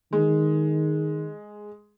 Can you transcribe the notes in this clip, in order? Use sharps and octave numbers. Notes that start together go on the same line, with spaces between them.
D#3 G#3